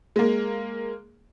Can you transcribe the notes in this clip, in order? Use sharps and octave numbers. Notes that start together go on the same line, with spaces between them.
G#3 A#3